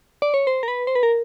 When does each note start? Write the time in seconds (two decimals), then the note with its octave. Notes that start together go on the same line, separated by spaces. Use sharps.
0.22 D5
0.34 C#5
0.47 C5
0.63 A#4
0.68 B4
0.87 C5
0.95 B4
1.03 A#4